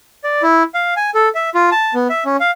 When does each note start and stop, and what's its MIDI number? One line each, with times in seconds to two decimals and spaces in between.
0.24 0.42 74
0.43 0.63 64
0.74 0.94 77
0.97 1.10 80
1.15 1.29 69
1.35 1.50 76
1.55 1.70 65
1.72 1.94 81
1.94 2.08 59
2.10 2.24 76
2.25 2.37 61
2.40 2.51 77